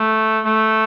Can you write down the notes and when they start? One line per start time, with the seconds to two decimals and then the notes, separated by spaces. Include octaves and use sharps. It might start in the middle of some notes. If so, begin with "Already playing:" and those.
Already playing: A3
0.44 A3